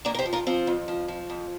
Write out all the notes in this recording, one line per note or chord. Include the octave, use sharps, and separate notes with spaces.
F2 A#3 D4
A#4
G4 C5
F3
F4 A#4
F3 C4 F4
F2
F3
F3
F2